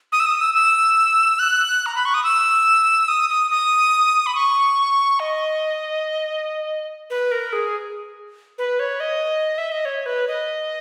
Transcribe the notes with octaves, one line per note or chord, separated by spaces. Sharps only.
D#6
E6
D#6
E6
E6
F#6
A#5
B5
C#6
D#6
E6
D#6
D#6
D#6
B5
C#6
D#5
B4
A#4
G#4
B4
C#5
D#5
E5
D#5
C#5
B4
D#5